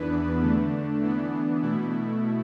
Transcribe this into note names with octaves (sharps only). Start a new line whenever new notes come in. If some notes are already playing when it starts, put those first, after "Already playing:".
Already playing: E2 E3 B3 D4 B4
D3 A3 D4
E3 B3 D4
B2 A3 E4